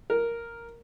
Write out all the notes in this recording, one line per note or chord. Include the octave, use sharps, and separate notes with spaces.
A#4